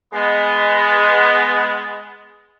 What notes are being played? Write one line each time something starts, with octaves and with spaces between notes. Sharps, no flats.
G#3 B3